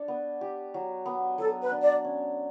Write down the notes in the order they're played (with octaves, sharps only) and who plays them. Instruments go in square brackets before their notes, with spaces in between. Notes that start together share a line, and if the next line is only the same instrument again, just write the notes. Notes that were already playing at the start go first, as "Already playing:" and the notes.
Already playing: [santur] D4 C#5
B3
G4
F#3
B3
[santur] F#3 [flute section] A4
[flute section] B4
[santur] D4
[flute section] D5
[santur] C#4